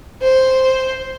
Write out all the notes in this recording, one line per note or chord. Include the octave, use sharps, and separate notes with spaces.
C5